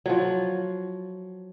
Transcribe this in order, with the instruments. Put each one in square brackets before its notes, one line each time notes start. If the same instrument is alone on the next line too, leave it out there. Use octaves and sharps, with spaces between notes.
[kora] F3 F#3